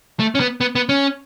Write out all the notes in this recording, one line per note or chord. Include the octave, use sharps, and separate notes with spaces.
A3
C#4
B3
B3
B3
C#4